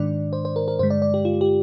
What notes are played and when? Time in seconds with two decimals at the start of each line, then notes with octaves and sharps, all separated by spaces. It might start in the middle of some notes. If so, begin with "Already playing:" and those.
Already playing: G#2 D#3 G#3 D4 D5
0.33 C5
0.45 C5
0.56 A#4
0.68 A#4
0.79 G2 D3 G#3 C5
0.90 D5
1.02 D5
1.14 G4
1.25 F4
1.41 G4